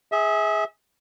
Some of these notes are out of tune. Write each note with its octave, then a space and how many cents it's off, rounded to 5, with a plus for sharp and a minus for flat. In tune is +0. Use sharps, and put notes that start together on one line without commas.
G#4 +0 E5 -30